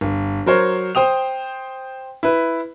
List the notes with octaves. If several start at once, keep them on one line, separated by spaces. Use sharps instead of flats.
G1
F#3 A#4 C5 C#5
C5 G5 D#6 F7
E4 B4